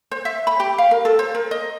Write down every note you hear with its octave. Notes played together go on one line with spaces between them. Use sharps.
C5
E5
B5
G4
F5
A#4
A4
C5
A#4
D#5